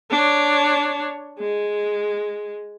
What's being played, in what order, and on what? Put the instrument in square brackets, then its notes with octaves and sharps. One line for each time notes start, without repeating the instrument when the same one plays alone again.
[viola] D4 C#5
G#3